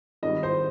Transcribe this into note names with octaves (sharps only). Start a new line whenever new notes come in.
G#1 G#2 D#3 G3 D#5
C5